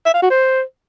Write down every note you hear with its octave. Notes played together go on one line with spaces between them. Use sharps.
E5
F5
F#4
C5